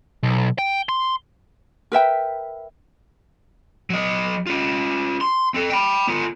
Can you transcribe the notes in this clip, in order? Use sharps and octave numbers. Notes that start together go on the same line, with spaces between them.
B1
G5
C6
A#4 B4 E5 G5
F#3 D#5
C#4 F4
C6
C4 A4
G5 B5
B3 F4